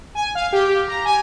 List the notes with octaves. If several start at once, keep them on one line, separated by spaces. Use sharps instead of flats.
G#5
F5
G4
A#5
G#5